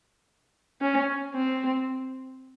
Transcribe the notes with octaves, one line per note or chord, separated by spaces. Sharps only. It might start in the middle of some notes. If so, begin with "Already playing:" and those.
C#4
C4